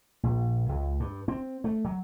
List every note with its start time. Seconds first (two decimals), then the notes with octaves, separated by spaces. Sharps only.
0.23 A#1
0.69 C#2
1.00 G2
1.28 C4
1.64 A3
1.85 F#3